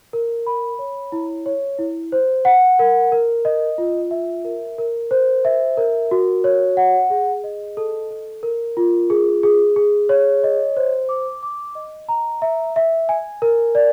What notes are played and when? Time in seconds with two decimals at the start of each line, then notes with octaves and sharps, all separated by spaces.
0.13 A#4
0.47 B5
0.79 C#5
1.12 E4
1.46 C#5
1.79 E4
2.12 C5
2.45 F#5
2.79 A#4
3.12 A#4
3.45 D#5
3.78 F4
4.11 E5
4.45 A#4
4.78 A#4
5.11 C5
5.45 E5
5.77 A#4
6.11 F#4
6.44 C#5
6.77 F#5
7.10 G#4
7.44 D#5
7.77 A4
8.11 A4
8.43 A#4
8.77 F4
9.10 G#4
9.43 G#4
9.76 G#4
10.09 C#5
10.44 D#5
10.77 C5
11.09 D6
11.43 D6
11.75 D#5
12.09 A#5
12.42 E5
12.76 E5
13.09 G#5
13.42 A#4
13.75 D5